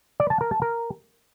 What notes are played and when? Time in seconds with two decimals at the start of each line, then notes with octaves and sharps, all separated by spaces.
0.20 D5
0.30 A5
0.41 A#4
0.51 A5
0.62 A#4